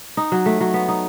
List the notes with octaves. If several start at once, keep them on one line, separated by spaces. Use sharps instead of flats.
D#4
F#3
A3
F#3
B3
D#4